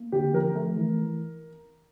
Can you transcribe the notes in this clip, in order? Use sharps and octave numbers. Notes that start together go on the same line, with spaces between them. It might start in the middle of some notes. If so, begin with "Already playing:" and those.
Already playing: A#3
D3 G4
F3 A#4
A3
E3